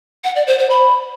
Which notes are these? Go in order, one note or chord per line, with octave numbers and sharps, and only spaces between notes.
F#5
D5
C5
C5
B5